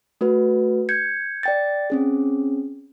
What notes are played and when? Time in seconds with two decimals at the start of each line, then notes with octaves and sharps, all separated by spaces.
0.21 A3 F#4 B4
0.89 G6 G#6 C#7
1.43 D5 G5 A6
1.90 C4 C#4 G#4